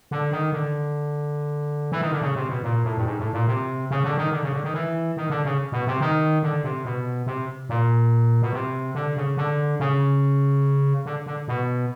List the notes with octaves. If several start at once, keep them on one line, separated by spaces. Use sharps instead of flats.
D3
D#3
D3
E3
D#3
D3
C#3
C3
B2
A#2
A2
G2
G#2
A2
A#2
C3
C#3
D3
D#3
D3
C#3
D3
D#3
E3
D#3
D3
C#3
B2
C3
D#3
D3
C3
B2
C3
A#2
B2
C3
D3
C#3
D3
C#3
D3
D3
B2